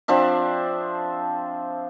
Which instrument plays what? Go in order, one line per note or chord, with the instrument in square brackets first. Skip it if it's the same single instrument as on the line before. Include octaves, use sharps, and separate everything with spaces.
[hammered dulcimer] F3 C4 D4 E5